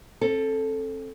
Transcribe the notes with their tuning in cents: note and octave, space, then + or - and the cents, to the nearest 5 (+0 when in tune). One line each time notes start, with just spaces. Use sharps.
C4 +35 A4 +0